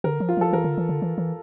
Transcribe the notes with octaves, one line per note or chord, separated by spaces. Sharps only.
D3 A#4
F3
F4
F3 A4
E3 A#4
D3
E3
D3
E3
E3